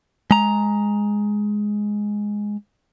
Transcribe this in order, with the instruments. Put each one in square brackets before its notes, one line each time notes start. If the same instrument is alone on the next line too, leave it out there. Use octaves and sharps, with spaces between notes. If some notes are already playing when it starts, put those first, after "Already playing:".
[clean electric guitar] G#3 A#5